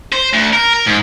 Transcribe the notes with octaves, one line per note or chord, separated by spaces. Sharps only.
C5
D2
A#4
A#4
G#2